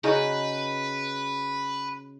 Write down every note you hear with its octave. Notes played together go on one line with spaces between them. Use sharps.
C#3 D#4 F#4 B4